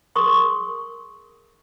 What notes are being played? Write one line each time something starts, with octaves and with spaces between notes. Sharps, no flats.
G#4 A#4 C6 C#6 D#6